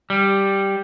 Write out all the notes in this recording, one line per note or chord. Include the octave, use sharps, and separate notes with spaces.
G3